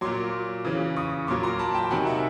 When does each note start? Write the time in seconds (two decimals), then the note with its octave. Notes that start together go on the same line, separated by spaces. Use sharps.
0.01 F#3 C6 D6
0.05 A#2
0.65 C#3 E3
0.97 C#6 D#6
1.27 A#2 F#3 C6 D6
1.43 A#5 C6
1.59 A5 B5
1.74 G5 A5
1.90 C3 D#3 F#3 F#5 G#5
2.07 E5 F#5